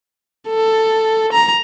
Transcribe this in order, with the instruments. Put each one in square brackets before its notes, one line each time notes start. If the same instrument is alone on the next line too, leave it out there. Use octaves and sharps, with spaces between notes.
[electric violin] A4
A#5